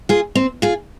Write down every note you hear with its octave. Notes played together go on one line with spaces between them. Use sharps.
F4 G#4
C4
F4 G#4